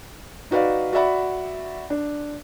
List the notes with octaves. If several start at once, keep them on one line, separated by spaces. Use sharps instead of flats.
D#4 F#4 B4 D5 F5
F#4 D5 E5 F#5 B5
D4